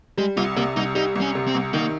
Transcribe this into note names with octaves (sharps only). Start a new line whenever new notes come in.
G3 G#3
C2 F4
C3 A#3
C2 D#4
G3 D#4
C2
C#4
C3
C4
C2
D#3 A#3